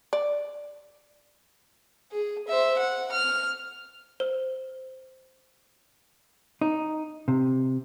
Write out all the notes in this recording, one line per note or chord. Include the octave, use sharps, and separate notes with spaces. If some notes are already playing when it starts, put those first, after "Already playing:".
D5
G#4
C5 E5
F#5
F6
C5
D#4
C3